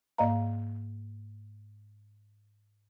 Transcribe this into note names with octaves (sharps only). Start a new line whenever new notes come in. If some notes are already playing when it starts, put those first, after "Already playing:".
G#2 A#3 D5 D#5 F5 A#5